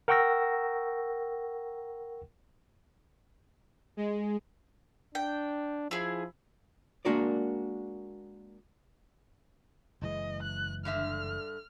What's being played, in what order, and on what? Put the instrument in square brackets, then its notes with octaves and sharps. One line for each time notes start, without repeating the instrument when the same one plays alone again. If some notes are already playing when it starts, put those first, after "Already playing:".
[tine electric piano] A#4 F#5 G5 C#6 E6 A#6
[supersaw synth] G#3
[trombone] D4 [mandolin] G5
[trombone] F3 [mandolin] E4 G#4
[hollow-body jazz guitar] G#3 A#3 D4 F#4 A#4 D5
[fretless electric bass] F#1 E3 G#3 [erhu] D#5
[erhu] F#6
[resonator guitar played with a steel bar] G2 D3 E5 [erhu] F6